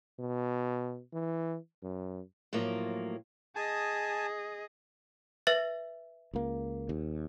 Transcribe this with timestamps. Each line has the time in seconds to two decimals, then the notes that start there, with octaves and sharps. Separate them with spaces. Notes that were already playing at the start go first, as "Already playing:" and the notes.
0.19 B2
1.13 E3
1.83 F#2
2.53 A2 F3 F#3 A#3
3.56 G#4 D#5 G#5 A5
5.47 B4 E5 A6
6.34 C#2 A#3
6.89 D#2